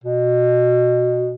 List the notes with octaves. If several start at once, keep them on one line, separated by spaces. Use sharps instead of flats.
B2